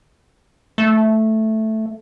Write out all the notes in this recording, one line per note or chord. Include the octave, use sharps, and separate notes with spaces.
A3